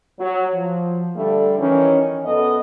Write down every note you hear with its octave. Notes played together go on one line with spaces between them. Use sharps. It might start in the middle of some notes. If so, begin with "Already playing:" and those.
F#3
F3
D3 G3 A3
D#3 E3 C#4
F#2 B3 A4 D#5